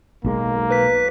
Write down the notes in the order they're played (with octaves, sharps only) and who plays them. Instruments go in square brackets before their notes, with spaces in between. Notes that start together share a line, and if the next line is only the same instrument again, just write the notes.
[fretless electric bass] B1 G#3 [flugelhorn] A#3
[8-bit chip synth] B4 B6